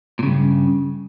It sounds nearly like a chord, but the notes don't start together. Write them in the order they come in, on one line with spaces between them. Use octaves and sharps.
A#2 C#3 G2